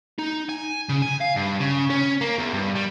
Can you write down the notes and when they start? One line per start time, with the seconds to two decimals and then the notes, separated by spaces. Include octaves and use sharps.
0.19 D#4
0.49 G#5
0.89 C#3
1.02 G#5
1.21 F5
1.36 G2
1.60 C#3
1.90 C#4
2.21 A#3
2.38 E2
2.54 G2
2.75 G3